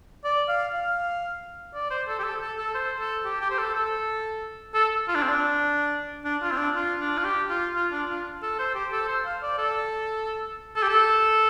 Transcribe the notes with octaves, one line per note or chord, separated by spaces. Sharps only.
D5
F5
F5
D5
C5
A4
G4
A4
A4
A4
C5
A4
G4
G4
C5
A4
A4
A4
F4
D4
C4
D4
D4
F4
C4
D4
F4
D4
F4
G4
F4
F4
D4
F4
A4
C5
G4
A4
C5
F5
D5
A4
A4
G4
A4